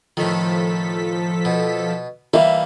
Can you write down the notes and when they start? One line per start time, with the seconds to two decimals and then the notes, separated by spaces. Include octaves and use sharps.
0.17 A2 D#3 F3 A4 B6
1.45 B2
2.34 E3 G3 A#3 E5 F5